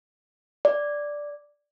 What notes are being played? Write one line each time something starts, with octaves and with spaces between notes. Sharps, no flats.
D5